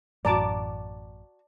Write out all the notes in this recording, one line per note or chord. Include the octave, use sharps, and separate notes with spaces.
A1 F#2 A2 F#4 D5 A5 A#5 D6